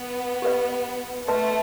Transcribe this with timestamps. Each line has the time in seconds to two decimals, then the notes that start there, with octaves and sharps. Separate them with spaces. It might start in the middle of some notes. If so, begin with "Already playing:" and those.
Already playing: B3
0.42 G4 B4 D#5
1.28 A3 B4 D#5 A5 C6